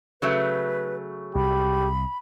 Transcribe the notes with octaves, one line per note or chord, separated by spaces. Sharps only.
C#3 F#3 A3 B4
C2 G4 B5